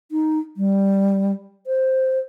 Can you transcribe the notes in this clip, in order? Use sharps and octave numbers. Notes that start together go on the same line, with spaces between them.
D#4
G3
C5